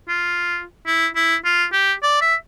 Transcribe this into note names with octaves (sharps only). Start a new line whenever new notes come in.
F4
E4
E4
F4
G4
D5
E5